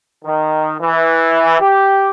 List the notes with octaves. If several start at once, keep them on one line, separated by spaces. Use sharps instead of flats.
D#3
E3
G4